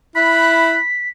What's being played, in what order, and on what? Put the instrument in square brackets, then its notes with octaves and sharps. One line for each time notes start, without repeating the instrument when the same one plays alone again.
[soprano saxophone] E4 [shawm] B5 [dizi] F#6 [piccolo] B6